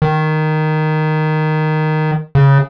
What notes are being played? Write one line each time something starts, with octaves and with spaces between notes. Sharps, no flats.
D#3
C#3